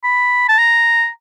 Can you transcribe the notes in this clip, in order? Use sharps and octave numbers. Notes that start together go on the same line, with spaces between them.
B5
A5
A#5